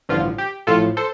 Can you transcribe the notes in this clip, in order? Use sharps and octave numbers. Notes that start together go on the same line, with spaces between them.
A1 G2 D3 F3 F4
G4
A1 A2 F3 F4 A4
A4 C5